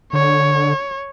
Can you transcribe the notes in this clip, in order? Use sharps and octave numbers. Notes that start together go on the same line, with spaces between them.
D3 C#5